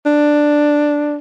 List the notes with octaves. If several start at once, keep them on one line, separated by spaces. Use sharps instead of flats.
D4